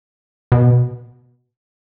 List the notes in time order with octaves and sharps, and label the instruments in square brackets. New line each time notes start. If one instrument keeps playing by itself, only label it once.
[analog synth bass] B2